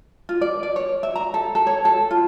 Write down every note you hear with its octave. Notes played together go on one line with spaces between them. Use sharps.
F4
D5
D5
C#5
E5
A#5
A4
A4
C#5
A4
F4